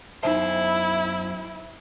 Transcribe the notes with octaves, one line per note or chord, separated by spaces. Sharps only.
F#2 D#3 D#4 E4 C5 E5